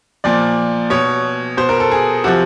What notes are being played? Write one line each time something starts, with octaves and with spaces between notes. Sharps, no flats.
A#2 F3 D5
B2 C#5
B2 C5
A#4
A4
G#4
C3 F3 F#4